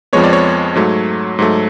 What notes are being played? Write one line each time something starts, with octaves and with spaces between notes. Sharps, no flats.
F2 F3 G#3 B3 C#5
D5
C#5
G#2 F#3 A3
G#2 F#3 A3